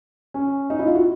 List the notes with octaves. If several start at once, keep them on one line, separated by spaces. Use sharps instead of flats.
C#4
D#4
E4
F4
F#4